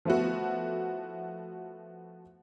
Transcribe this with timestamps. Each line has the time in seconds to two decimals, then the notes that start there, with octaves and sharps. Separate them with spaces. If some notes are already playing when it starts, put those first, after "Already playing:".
0.05 F3 A3 B3 E4 F#4